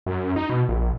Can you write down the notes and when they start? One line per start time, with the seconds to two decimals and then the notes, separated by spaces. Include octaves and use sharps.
0.06 F#2
0.36 D#4
0.50 B2
0.69 A#1